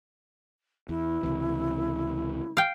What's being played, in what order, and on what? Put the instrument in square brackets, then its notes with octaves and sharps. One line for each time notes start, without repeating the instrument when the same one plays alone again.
[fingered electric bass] E2 [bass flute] E4
[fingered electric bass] C#2 C3 E3
[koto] F5 G5